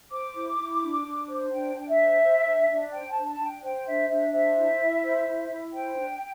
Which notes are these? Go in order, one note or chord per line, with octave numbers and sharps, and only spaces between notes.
C5 D6
E4
E4
D4
D4
C5
D4 G5
D4 G5
E5
C5
C5
D4
D4
C5 G5
A5
D4
A5
D4
G5
C5 G5
D4 E5
D4 E5
C5 E5
E4
E4
C5
E4
E4
C5 G5
D4